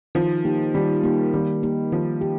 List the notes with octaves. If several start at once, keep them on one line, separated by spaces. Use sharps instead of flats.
D#3 F3
A#3 D#4 G4
D#3 G3
A#3 D#4 G4
D#3 G3
A#3 D#4 G4
D#3 F3
G4